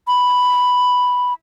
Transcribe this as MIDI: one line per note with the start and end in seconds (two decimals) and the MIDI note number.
0.07 1.33 83